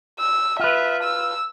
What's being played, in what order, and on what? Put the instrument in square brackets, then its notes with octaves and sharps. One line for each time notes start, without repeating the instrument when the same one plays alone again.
[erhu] E6
[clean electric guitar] F4 B4 [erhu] E5
[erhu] E6